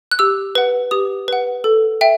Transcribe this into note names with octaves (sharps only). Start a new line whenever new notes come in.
F#6
G4 E6
B4 F#5
G4 D#6
B4 F#5
A4
E5 G5